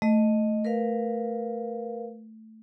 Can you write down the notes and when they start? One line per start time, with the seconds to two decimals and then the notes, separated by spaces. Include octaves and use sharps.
0.02 A3 D#5
0.65 A#4 B4 F5